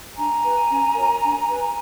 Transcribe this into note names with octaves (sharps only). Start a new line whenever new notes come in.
D4 G#5 A#5
G4 B4
C#4
F#4 A#4 C#5
D4
G4 B4